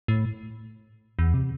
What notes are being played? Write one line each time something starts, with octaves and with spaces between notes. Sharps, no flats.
A2
E2
C3